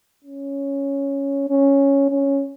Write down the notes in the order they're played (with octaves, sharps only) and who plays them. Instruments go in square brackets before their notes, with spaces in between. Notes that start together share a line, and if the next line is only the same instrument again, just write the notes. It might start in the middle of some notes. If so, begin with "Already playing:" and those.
[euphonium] C#4
C#4
C#4